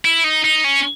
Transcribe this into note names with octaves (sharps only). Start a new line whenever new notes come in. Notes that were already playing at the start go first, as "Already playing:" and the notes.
E4
D#4
D#4
C#4